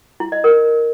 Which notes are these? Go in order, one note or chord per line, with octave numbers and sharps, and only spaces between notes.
E4
D#5
A#4